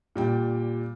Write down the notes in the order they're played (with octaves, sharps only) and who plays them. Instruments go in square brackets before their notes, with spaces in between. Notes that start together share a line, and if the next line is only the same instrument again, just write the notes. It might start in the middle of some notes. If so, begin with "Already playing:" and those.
[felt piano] A#2 G3 G5